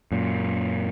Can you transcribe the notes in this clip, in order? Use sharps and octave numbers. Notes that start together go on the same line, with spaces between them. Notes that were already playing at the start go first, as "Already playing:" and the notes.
F#2 A#2